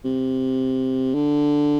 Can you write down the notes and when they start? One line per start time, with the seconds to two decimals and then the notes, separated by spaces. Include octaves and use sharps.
0.05 C3
1.14 D3